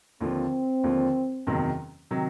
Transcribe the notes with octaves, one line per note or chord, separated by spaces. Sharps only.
D#2 D3 F3 C4
D#2 D3 F3
F#1 E2 C3 D#3 F#3
C3 D#3 F#3